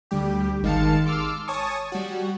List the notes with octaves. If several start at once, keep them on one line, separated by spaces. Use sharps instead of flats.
D2 G3 G4
G#1 D#3 G#3 F5 A5 C#7
C6 D6 E6 F6
C#5 G#5 A5 C#6 D#6
G3 F#4